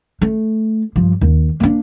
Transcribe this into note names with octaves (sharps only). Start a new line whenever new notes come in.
A3
G2 F3
D#2
A#3 D4